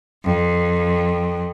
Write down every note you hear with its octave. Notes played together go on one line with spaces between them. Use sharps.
F2